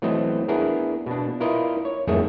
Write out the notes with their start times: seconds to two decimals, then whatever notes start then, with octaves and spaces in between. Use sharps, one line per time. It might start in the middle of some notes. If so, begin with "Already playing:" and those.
0.02 E3 F#3 A3 B3 C4 D#5
0.48 B3 D4 E4 G#4 A#4
1.06 B2 D4
1.40 E4 F4 A#4 B4 D5 D#5
1.85 C#5
2.07 G#1 F2 D#3 A3 G#4 E5